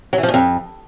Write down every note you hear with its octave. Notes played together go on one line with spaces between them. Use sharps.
F#3
E3
F3
A#2
F2